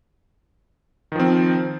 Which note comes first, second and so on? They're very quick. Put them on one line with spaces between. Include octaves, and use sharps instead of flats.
D#3 F3 C4